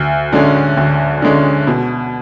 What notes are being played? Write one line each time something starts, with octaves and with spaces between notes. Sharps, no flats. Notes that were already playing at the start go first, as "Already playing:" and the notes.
Already playing: D2
D3 G#3 C#4
D2
D3 G#3 C#4
B2